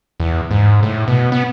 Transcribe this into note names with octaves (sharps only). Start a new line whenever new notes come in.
E2
G#2
A2
B2
B3